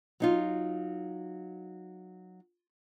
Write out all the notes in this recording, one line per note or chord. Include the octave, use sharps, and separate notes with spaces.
F#3 D#4 F4